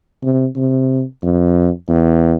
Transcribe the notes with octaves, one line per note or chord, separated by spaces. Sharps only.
C3
C3
F2
E2